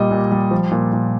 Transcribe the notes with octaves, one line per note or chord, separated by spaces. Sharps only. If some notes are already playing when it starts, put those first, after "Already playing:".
Already playing: A#2 G3 D#5
A#2
G3
F3
A#2
A#2